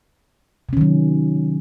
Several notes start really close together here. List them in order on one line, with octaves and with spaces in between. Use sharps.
C3 C#4 D#3 F#3